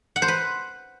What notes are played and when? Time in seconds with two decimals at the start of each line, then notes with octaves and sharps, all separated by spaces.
0.16 F#5
0.22 C5
0.28 B4